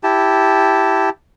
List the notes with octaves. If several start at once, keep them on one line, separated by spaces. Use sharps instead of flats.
E4 G4 A5